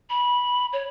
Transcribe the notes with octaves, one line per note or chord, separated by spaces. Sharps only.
B5
C#5